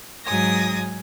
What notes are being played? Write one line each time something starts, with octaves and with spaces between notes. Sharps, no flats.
G#2 F#3 G#5 D#6 A#6